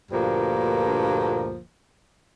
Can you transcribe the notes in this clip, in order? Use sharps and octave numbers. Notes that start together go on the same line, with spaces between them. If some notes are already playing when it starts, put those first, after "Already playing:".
D2 G2 A#2 D3 F3 A#3